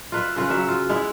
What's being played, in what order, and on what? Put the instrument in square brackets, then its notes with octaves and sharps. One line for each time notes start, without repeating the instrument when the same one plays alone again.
[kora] F4 B4 E5
C#3 F4 B4
F#3 E5
F4
G#3 B3 E4